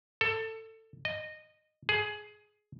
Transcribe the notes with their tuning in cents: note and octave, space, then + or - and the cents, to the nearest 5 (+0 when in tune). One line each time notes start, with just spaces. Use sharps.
A4 +20
D#5 -15
G#4 +15